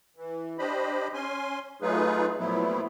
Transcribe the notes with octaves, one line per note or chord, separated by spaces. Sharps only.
E3
D4 G4 C5 D#5 B5
C#4 G#5 C6
F#3 A3 D#4 F4 G#4 B4
A#2 F3 F#3 A3 B3 E4